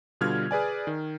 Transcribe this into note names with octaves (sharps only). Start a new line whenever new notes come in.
B2 D3 G3 F4 F6 G#6
G#4 B4 D5 G#5
D#3